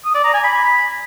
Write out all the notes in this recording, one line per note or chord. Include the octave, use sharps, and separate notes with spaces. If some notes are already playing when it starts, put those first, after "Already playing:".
D#6
D5
A#5
G#5
B5